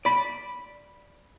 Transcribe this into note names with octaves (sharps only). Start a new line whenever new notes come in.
D5 B5